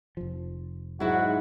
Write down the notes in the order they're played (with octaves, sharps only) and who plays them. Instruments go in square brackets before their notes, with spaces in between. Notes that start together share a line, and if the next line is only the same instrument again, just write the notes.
[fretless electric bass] F1 F3
[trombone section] G#2 [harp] F#3 E4 [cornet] F#4